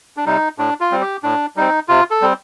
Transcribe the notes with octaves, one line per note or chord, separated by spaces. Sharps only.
D4
C3 G3 D#4
A2 D4
F4
G3 C4
G4
A2 D4
G3 C4 D#4
C3 F4
A4
G3 C4